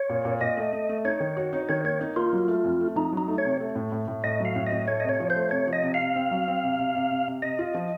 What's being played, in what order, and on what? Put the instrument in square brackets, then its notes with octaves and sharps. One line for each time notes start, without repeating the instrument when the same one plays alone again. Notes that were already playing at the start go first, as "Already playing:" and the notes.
Already playing: [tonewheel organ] C#5
[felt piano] A#2
A#2
[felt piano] A#2 [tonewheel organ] D#5
[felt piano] A3
A3
A3
[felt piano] D#4 [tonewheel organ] C#5
[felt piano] D#3
F#4
D#4
[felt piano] D#3 [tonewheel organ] C#5
[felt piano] A#3 [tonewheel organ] C#5
[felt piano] D#4
[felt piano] A#3 [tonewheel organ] F4
[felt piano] F#3
A3
F2
A3
[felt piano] F2 [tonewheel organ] D#4
[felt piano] F#3 [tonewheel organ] D#4
[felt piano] A3
[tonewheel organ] C#5
[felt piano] C3
A3
A2
A2
A2
[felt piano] A2 [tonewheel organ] D#5
[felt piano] F#3 [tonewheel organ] F5
[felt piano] A2
[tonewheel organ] D#5
[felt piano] A2
[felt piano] A3 [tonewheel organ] C#5
[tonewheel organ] D#5
[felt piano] C3
[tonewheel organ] C#5
[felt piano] F3
[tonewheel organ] C5
[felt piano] A3
[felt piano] C3 [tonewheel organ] C#5
[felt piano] F3
[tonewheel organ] D#5
[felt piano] C3
[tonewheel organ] F5
[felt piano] C3
C4
F#3
C4
C3
C3
C3
C3
C3
[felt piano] C3 [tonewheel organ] D#5
[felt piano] F4
F3